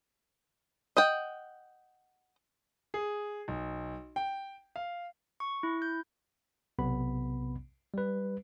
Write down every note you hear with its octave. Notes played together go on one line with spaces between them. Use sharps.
D#5 F#5 G5
G#4
B1
G5
F5
C#6
E4
G6
B1 C3 B3 B5
G3 B4